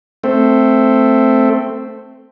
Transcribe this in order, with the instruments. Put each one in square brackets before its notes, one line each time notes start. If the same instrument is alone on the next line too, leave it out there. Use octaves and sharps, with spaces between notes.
[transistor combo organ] A3 C4